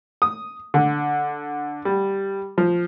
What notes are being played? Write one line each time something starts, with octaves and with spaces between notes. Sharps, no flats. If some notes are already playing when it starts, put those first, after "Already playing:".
D#6
D3
G3
F3